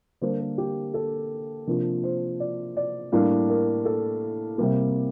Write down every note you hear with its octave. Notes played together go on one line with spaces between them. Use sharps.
D3 G3 A#3 D4 C5
A#4
G4
A4
C3 F3 A#3 D4 A#4
C5
D5
D5
A2 G3 A#3 D4 F5
A#4
A4
C3 G3 A#3